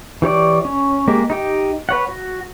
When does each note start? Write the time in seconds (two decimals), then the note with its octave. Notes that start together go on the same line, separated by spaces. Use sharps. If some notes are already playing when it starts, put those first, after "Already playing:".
0.22 E3 G4 C#5 D5
0.65 C#4
1.08 G#3 A#3 G4
1.30 D#4 G4 G5
1.89 B4 C#5 F#5
2.09 F#4